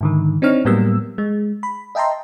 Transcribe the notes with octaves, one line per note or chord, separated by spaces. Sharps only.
G#2 D3 D#3
C4 D4 D#4 C#5 F6
A2 F#3 G3 A#3 B3 E6
G#3
B5
D#5 E5 G5 A5 A#5 C6